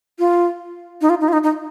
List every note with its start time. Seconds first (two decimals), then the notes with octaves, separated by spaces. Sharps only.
0.19 F4
1.01 D#4
1.10 F4
1.21 D#4
1.28 F4
1.33 D#4
1.44 D#4